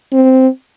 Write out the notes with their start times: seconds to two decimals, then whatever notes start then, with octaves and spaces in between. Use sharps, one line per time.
0.12 C4